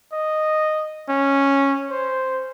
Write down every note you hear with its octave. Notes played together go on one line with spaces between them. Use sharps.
D#5
C#4
C5